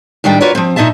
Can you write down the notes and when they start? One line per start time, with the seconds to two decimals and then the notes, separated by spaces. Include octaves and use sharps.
0.24 A2 D#3 G3 D4 G5
0.40 F4 F#4 A#4 B4 C#5 D5
0.55 F3 C4
0.76 A#2 D#4 D#5 E5 A5